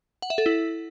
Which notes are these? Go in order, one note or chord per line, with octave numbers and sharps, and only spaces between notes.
F#5
E5
A4
E4